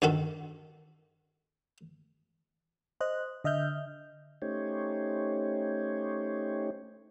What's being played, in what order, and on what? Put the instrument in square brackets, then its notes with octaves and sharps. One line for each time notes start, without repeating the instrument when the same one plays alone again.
[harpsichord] G2 D#3 F#4 A4
[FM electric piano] C5 D#5 F#6
D3 D#5 E5 F6 G6
[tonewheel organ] A3 C#4 D#4 G4 C5 C#5